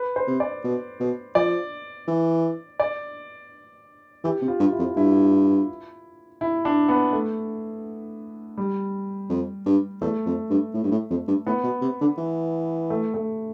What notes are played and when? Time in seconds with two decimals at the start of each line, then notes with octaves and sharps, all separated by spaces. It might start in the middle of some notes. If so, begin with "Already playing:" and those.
Already playing: B4
0.16 C5
0.27 C3
0.40 D5
0.64 B2
1.00 B2
1.35 F3 D5
2.08 E3
2.80 D5
4.24 E3 G4
4.42 C3
4.48 F4
4.60 G2
4.73 E4
4.79 F2
4.97 G2 E4
6.41 E4
6.65 D4
6.89 B3
7.13 A3
8.57 G3
9.30 F2
9.66 G2
10.01 E2 A3
10.26 F2
10.50 G2
10.74 A2
10.84 G2
10.91 A2
11.10 F2
11.28 G2
11.46 A2 B3
11.64 B2
11.82 C3
12.01 D3
12.18 E3
12.90 A3
13.14 A3